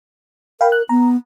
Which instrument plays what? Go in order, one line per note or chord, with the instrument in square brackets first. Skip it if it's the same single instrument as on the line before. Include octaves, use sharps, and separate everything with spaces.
[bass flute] A#4 [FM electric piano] F5 G5 B5
[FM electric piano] F#6
[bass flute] B3 [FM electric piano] A#5